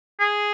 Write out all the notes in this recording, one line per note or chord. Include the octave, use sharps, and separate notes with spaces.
G#4